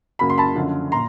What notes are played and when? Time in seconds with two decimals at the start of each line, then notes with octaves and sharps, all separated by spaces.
0.19 F#2 C#3 F#3 A#3 B5
0.30 C6
0.38 A5 B5
0.55 F#2 D3 F3
0.92 A#2 A#5 C6